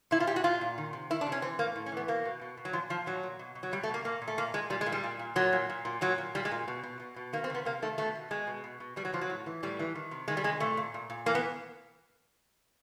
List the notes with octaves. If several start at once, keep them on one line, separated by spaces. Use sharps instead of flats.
A#2 E4
F4
A#2 G4
F#4
A#2 F4
A#2
D#3
C3
D#3 E4
D4
C3
C#4
E3 C4
A2 A#3
A2
C#4
E3 B3
B2 A#3
B2
B2
B2
F#3
A#2 F3
A#2 F3
A#2 F#3
A#2
B2
B2
F#3
B2 G3
A3
B2
A#3
A#2 A#3
A#2
A3
A#2 A#3
A#2 G#3
A#2 G3
G#3
A#2
G3
A#2
A#2
A#2 F#3
A#2
A#2
A#2
A#2 F#3
A#2
A#2 G3
G#3
A#2
B2
B2
B2
B2
D#3 A#3
C4
C3 B3
C3 A#3
D#3 A3
B2 A3
B2
B2 G#3
B2
B2
B2
B2 G3
F#3
B2 F3
F#3
A2
E3
A2 G3
E3
D#3
C3
D#3 G#3
G3
C3 G#3
A#2 A3
A#2
A#2
A#2
E3 A#3
B3